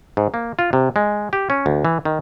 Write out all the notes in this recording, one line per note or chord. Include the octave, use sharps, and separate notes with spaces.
G#2
A#3
F4
C3
G#3
G4
C#4
D2
E3
D#3